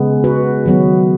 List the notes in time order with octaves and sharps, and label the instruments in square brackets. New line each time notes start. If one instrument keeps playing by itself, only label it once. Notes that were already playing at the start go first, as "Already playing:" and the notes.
Already playing: [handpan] C#3 G#3 B3
F#4 B4
D#3 F#3 B3